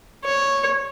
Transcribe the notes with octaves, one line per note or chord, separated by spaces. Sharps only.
C#5